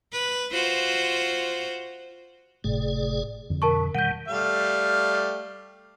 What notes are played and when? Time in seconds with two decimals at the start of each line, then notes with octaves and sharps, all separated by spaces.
0.13 B4
0.51 F4 F#4 C5
2.64 G1 A2 C3 A3 G#4 D5
3.50 F2 D3
3.62 B2 A#4 A5 C#6
3.95 B2 D#3 G3 F#5 G6
4.28 G3 A3 F5